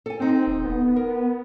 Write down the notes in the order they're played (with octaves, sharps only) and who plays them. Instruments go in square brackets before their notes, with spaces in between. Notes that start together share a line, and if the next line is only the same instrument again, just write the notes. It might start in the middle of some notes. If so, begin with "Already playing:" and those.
[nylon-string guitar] A4 G#5
[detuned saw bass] C4 [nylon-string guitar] D#4 A4
[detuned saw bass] D#1
B3
[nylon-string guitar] A#4